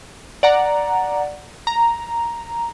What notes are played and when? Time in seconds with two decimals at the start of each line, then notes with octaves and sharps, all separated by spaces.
0.43 D5 F#5 A#5
1.67 A#5